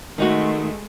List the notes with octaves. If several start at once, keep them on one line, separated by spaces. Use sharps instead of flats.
D#3 G#3 A3 D#4 F#4